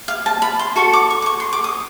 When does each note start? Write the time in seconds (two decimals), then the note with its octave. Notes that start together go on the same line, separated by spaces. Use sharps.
0.08 F5
0.26 A5
0.42 B5
0.59 C6
0.76 F#4 A4 C#6
0.93 D6
1.10 C#6
1.22 D6
1.26 C#6
1.40 C6
1.53 D6
1.64 D#6